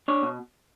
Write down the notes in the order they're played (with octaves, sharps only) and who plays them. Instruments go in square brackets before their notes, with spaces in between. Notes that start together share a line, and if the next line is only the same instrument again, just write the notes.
[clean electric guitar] D4 C#5
B2